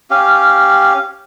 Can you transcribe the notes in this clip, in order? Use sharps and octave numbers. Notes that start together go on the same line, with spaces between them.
C#4 G4 F5